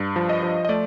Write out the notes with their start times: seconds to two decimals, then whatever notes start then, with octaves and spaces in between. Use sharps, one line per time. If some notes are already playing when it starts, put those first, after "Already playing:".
Already playing: G2
0.16 F3
0.29 D#5
0.43 F3
0.65 D#5
0.69 A3 D5